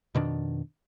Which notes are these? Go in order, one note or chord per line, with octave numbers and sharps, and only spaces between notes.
F2 B2 D#3 D4